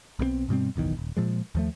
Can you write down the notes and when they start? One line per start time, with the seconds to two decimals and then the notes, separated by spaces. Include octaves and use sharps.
0.19 B1 B2 F#3 C4
0.49 G2 B2 G3 C4
0.76 F#1 B1 E2 D#3
0.97 D#1
1.17 A#2 F3 G#3
1.55 D#2 F3 A3